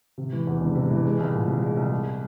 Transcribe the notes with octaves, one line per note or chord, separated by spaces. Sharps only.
C3
E3
E2
E1
C3
E3
G#3
C2
A#2
C2
G#3
C2
G#3